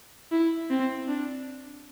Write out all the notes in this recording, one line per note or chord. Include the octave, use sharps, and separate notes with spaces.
E4
C4
D4